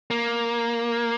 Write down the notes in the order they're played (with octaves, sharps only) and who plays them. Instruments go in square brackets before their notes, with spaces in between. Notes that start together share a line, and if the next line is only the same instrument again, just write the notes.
[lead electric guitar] A#3